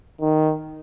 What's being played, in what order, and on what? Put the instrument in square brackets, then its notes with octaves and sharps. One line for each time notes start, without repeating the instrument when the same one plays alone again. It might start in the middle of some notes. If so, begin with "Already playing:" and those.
[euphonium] D#3